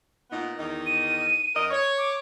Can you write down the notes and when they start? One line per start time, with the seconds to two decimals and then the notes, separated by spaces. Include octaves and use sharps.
0.31 A#2 B3 D#4
0.58 E2 D#3 D#4
0.86 D#7
1.55 F#2 A#4 D#5
1.71 C#5
1.98 D6